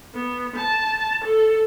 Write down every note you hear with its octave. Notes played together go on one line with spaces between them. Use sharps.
B3
A5
A4